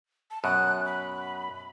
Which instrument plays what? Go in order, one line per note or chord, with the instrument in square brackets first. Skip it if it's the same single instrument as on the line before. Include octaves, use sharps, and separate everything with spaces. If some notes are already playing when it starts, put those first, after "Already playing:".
[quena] A5
[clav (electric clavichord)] F#2 B2 [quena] F#6
[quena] B5